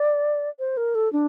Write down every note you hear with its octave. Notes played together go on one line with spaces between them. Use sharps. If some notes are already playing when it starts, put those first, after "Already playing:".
Already playing: D5
C5
A#4
A4
D4